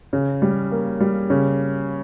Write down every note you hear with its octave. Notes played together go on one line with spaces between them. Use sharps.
C#3
G3
A#3
G3
C#3